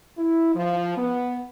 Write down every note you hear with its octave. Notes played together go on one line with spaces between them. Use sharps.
E4
F3
B3